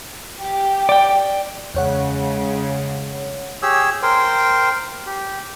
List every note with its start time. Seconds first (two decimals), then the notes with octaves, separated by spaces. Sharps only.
0.41 G4
0.89 D5 G5
1.75 E2 C#3 G#3 C#5 F#5
3.63 G4 G#4 C#5 E6
4.03 A#4 C5 G5 C6
5.06 G4